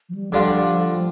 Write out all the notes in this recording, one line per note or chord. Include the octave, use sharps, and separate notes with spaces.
F3
G3
D3 F3 G3 D4 F4